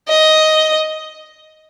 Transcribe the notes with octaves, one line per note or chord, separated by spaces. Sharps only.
D#5